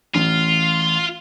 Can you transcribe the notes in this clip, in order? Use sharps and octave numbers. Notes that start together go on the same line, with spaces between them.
A1 F4